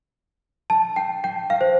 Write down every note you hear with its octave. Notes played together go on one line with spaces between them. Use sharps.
A5
G5
G5
F5
C5